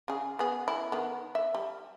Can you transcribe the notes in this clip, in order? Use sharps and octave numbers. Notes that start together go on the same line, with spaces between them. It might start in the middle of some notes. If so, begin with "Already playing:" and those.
C#3 G#4
B3 G#4
E4
D#3 B3
E5
G3